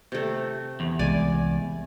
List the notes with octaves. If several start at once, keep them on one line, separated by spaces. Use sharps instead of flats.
C3 A3
E2
C2 G#3 D5 G#5